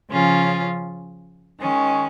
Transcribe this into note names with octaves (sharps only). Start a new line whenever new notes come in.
C#3 F3 C#4 F4 G#4
D#3 G#3 C#4